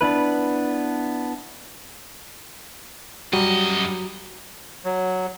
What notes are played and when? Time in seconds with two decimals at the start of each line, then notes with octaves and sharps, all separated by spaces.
0.01 B3 D4 E4 B4
3.33 F#2 F#3 G3 F#4 D#5
4.85 F#3